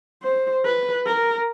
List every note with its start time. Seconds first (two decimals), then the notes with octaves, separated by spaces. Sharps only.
0.23 C5
0.65 B4
1.06 A#4